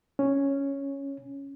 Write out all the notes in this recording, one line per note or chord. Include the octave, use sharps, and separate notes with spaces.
C#4